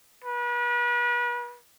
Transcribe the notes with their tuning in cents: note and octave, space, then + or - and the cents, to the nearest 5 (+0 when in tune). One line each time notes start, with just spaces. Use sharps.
B4 -35